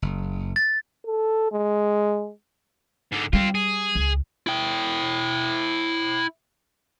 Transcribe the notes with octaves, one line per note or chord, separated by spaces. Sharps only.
F#1
A6
A4
G#3
G#2 D3
G3 C4 F4
G#4
C#2
E4 G5